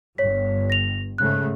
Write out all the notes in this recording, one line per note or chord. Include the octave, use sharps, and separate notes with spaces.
G1 G2 C#5 B6
A#6 F7
G#2 C#3 A3 F#6